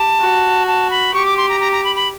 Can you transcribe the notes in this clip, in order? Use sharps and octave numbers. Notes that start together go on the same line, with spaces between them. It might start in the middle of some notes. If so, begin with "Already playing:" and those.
Already playing: G4 A5
F#4
A5
B5
G4 C#6
D6
C6
A#5
A#5
A#5
B5
B5